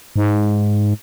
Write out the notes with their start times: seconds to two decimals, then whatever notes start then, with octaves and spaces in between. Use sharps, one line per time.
0.16 G#2